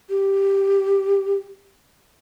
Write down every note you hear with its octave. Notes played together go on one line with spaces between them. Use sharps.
G4